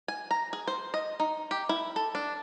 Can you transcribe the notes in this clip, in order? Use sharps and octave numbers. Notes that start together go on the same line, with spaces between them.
G#5
A#5
G#4
C5
D#5
D#4
G4
E4
A4
D4